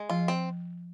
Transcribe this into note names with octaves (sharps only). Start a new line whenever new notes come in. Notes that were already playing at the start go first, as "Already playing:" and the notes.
Already playing: G#3
F3 F4
C4